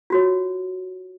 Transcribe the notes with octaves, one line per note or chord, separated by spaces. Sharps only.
F4 F#4 C#5